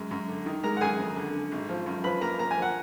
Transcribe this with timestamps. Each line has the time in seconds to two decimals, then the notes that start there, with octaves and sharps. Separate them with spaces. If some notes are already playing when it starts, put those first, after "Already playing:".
Already playing: F#2 G#3
0.11 F#2
0.28 D3
0.46 D#3
0.64 G#3 A#4 A#5
0.77 F#5
0.81 F#2 G#4 G#5
0.99 F2
1.16 D3
1.34 D3
1.52 G#1
1.69 F3
1.86 F#2
2.04 F3 B4 B5
2.21 A#3 A#4 A#5
2.39 A#3 A#5
2.51 G#5
2.57 F3
2.62 F#5